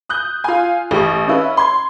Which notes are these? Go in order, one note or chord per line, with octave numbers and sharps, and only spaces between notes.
D#6 F#6 G6
F4 G#5
A1 G4 C#6
C#4 E4 B4
C6 G#6